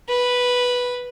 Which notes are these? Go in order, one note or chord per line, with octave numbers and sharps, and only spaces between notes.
B4